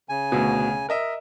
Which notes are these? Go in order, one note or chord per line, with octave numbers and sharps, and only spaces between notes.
C#3 G#5
D2 B2
A#4 D#5 E5